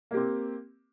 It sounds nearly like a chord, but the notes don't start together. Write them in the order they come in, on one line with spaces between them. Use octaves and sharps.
A#3 G4 C4